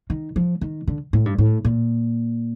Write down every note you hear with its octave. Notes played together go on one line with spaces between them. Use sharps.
D#3
F3
D#3
D3
A2
G2
A2
A#2